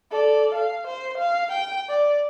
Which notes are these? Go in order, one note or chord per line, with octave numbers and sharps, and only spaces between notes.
A4 D5
F5
C5
F5
G5
D5